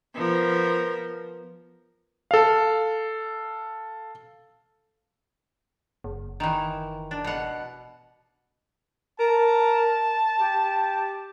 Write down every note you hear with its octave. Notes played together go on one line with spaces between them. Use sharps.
F3 B3 A#4
A4 F5
F#1
D#3 E3
D4
B2 F#5
A#4 A5
G4